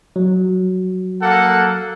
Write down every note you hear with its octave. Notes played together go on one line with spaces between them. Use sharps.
F#3
A#3 A4 F#5